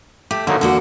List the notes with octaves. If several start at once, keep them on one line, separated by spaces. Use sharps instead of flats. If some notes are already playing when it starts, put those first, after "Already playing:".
A3 G4
D3 F#3 A#3 D#4
E2 D3 A#3 F#4